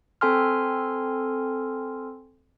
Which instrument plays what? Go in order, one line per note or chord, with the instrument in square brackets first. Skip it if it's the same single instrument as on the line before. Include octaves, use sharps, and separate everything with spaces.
[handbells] C4 A4 G#5 C6 F6